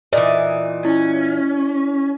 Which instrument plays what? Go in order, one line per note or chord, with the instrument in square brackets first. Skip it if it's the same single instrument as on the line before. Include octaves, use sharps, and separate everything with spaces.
[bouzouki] A#2 E3 [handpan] D5 D#5
[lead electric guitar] C#4 [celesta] E4